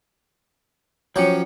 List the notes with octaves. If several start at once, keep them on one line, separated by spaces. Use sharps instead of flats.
F3 F#3 C#4 F#4 G4